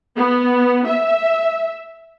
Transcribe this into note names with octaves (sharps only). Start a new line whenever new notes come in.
B3
E5